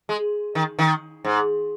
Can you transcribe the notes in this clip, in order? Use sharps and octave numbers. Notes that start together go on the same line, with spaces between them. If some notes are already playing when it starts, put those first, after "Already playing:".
G#3
D#3
D#3
G#2